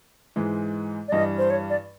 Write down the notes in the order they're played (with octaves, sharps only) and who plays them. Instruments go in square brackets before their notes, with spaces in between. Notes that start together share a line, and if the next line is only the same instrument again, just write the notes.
[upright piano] G#2 E3 G#3
[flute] D5
[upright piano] G2 E3 G3 [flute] D#5
[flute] C5
C#5
D5